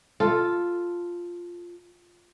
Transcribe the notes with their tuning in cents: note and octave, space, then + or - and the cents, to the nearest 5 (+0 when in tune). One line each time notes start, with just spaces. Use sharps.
F4 +0 A4 +0